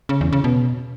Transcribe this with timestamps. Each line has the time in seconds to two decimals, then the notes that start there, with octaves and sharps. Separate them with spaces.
0.09 C#3
0.21 E2
0.33 C#3
0.44 B2